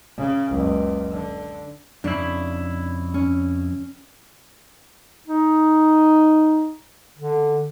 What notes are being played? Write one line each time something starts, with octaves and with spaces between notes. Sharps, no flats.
C#3
F#1 C#2
D3
F2 C#3 D4 E4
C#4
D#4
D3